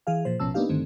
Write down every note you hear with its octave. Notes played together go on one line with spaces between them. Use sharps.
E3 G#4 F5
A#2 F3 C5
A1 B2 F3 C#4 A5 E6
A#3 B3 D4 D#4 G4 F5
G2 D3 D#3 A3 C4